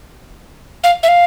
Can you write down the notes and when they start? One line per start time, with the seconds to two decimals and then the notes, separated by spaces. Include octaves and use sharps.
0.84 F5
1.03 E5
1.08 F5